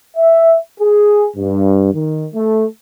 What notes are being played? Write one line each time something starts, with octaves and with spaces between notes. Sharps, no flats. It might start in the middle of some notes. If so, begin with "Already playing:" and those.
E5
G#4
G2
D#3
A3